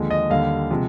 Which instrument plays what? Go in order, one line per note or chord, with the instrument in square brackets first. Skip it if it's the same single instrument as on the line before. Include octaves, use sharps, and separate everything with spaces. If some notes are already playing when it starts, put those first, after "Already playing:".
Already playing: [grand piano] D#2 D3 F3 G#3
D#5
D#2 D3 G3 F5
C3 F3 G#3